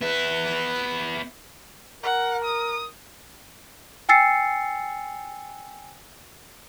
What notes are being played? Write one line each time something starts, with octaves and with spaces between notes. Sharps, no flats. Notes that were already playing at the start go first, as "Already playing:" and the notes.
B3 B4 E5
A#4 F#5
D#6
G5 G#5 E6 A6 C7 C#7